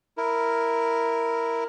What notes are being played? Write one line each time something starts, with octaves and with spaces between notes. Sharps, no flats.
E4 A#4